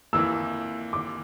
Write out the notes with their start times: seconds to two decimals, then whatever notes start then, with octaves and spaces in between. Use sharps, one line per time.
0.13 F2 E3 A#3 E6
0.93 D6